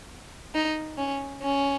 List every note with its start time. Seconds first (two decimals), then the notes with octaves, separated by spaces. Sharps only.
0.54 D#4
0.97 C#4
1.42 C#4